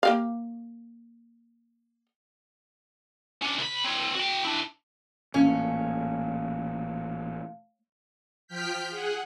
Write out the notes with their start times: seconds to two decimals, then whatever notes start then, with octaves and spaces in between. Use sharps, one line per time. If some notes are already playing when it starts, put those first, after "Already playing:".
0.03 A#3 G4 F5
3.43 C#4 D4
3.59 C2 B5
3.85 C4 C#5
4.15 F#4 G5
4.44 D4 E4
5.34 A1 A#2 A3 C#4 F5
8.47 F3 G5 F6 G6 B6
8.89 G#4 F#5